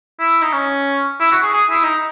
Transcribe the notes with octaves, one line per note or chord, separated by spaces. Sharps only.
E4
D#4
C#4
E4
F#4
G#4
G#4
E4
D#4